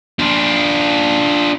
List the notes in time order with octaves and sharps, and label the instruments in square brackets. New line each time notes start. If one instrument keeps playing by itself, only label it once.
[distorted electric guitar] D4 F4